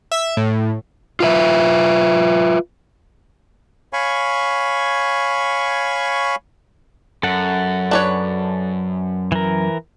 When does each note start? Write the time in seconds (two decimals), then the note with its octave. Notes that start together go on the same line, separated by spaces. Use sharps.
0.12 E5
0.37 A2
1.20 F4 B4 E5
3.93 C#5 F5 G#5 B5 C#6
7.23 F#2 A4 F#5
7.91 D4 B4 C#5
9.32 E3 A#4